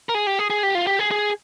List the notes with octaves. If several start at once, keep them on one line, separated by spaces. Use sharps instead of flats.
A#4
G#4
G4
G#4
G#4
G4
F4
G4
G#4
G#4